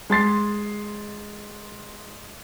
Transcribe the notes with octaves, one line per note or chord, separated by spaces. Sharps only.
G#3 C6 A6 C7